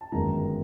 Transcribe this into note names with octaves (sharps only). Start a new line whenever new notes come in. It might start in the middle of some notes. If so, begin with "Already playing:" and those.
A5
G1 F#2 D#3 G#3 A#5